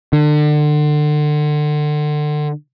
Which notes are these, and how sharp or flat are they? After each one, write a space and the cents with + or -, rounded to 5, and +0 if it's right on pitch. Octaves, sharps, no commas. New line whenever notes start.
D3 +30